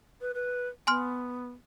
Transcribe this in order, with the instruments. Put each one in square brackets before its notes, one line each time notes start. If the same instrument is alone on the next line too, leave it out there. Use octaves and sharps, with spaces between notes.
[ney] B4
B4
[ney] B3 [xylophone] G#5 C6 F6